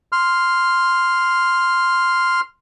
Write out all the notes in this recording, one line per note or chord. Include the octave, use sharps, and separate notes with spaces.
C6 F6